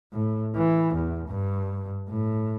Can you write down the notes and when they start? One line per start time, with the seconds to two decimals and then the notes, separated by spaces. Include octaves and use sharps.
0.13 A2
0.56 E3
0.94 E2
1.28 G2
2.09 A2